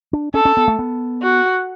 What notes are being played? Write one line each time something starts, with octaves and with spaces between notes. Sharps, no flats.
D4
C#4 A4
C#4
B3
A3
B3
F#4